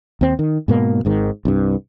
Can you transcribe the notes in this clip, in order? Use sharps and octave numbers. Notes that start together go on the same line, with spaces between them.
D#2 C4
D#3
G#2 B2 A#3
G#1 G#2 D#3
C2 G2